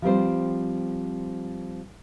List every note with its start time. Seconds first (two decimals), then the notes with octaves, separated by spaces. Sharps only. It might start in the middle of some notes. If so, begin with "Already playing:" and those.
0.02 F3 G3 C4 C5